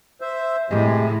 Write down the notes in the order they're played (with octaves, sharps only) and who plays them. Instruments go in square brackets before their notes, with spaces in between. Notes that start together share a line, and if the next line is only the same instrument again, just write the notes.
[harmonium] C5 E5
[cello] A2 [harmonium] C3 G#3